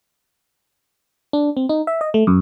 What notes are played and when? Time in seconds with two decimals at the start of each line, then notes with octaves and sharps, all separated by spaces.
1.33 D4
1.57 C4
1.69 D#4
1.87 E5
2.01 D#5
2.14 A3
2.27 F#2